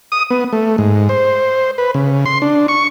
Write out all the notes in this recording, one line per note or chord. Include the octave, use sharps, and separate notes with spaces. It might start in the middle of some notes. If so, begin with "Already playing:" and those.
D#6
B3
A3
G#2
C5
B4
C#3
C6
D4
C#6